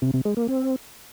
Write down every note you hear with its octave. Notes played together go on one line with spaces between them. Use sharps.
C3
C3
G#3
A#3
C4